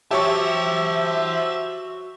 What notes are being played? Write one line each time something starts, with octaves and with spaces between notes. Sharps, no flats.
F#4 G4 C5 C#5 E5 A5 C#6